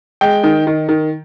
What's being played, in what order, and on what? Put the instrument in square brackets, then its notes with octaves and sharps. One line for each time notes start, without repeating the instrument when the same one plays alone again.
[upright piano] G#3 G5
D#3
D#3
D#3